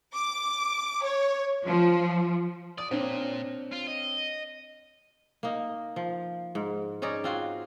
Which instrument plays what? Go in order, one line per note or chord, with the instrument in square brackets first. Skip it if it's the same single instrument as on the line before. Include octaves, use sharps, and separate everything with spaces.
[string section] D6
C#5
F3
[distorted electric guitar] D5 [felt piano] D#6
[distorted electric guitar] A#2 [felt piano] C4 D4 C#5
[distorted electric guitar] F4
D#5
[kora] A#3 D#4
F3
G#2
C#4 D#4 G#4 D5
C4 F4 F#4